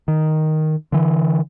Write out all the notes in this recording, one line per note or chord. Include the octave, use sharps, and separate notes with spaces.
D#3
D3 E3